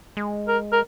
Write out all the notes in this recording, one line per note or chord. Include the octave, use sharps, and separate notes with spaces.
G#3
A#4
A#4